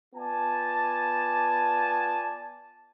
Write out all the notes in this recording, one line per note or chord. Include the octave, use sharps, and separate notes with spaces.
B3 F4 D5 G#5 A5